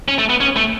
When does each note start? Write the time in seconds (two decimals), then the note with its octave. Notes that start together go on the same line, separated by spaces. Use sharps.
0.08 C#4
0.19 A3
0.30 B3
0.41 C#4
0.56 A3